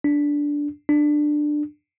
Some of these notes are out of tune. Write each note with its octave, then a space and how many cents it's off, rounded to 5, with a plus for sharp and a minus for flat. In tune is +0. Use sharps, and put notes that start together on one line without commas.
D4 -10
D4 +15